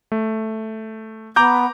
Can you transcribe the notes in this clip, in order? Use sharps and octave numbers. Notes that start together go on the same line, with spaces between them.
A3
B3 A#5 D6 G6